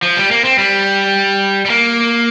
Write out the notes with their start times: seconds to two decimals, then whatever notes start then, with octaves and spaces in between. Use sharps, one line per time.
0.03 F3
0.17 G3
0.31 A#3
0.45 C4
0.58 G3
1.66 G3
1.70 A#3